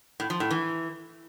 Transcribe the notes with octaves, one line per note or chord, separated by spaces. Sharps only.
A2
F3
A2
E3